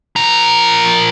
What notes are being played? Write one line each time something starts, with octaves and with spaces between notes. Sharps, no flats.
F3 A#4